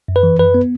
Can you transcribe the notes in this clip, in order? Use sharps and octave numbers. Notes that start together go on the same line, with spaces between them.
F#2
B4
E3
F#2 B4
B3